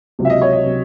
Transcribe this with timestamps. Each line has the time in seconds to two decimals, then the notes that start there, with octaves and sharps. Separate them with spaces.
0.19 C#2 C3 F#3
0.25 E5
0.30 D#5
0.42 C#5
0.52 D#5
0.65 C3 F#3